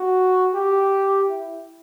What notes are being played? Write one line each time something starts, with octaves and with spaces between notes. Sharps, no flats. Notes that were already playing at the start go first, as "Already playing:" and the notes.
Already playing: F#4
G4
E4